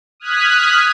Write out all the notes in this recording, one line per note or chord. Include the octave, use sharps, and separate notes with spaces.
D#6 F6 F#6 G#6 B6